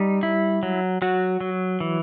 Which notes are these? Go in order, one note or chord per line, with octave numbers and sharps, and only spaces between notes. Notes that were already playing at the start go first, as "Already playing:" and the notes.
Already playing: G3 D#4
E4
F#3
F#3 F#4
F#3
E3